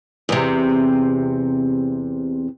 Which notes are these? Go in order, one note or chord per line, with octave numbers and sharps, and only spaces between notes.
E2 C3